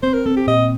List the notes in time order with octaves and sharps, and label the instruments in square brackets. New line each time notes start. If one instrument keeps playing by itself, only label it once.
[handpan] C4 [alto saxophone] C5
[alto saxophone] A#4
[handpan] C4 [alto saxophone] A4
[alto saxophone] G4
[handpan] A#2 [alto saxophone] D#5